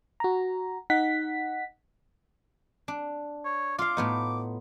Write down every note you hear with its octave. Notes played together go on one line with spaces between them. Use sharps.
F#4 A#5
D#4 F#5 B6
D4
C#5
F4 F5 D6
A2 B3 D#4